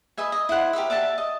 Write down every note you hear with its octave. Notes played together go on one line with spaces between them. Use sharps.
B4 D#5 E5 G#5
D#5
E4 C5 F#5
G4 A#4 B4 E5
D5 E5 F#5 A5
D#5